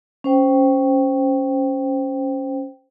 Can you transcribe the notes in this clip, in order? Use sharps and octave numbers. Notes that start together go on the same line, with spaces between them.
C#4 C5 G5